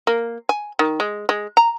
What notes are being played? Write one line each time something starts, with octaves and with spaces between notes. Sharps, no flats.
A#3
G#5
D#3
G#3
G#3
A#5